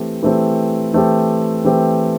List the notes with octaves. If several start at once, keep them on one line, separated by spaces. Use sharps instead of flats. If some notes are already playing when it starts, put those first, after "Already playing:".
Already playing: E3 A3 C4 G4
E3 A3 C4 G4
E3 A3 C4 G4
E3 A3 C4 G4